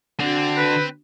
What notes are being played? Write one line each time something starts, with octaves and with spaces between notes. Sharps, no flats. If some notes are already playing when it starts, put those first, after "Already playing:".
D3 C4 D4 F#4
B4